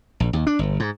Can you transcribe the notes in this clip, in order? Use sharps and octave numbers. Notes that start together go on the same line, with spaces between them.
A#1
D#2
D4
G1
G#2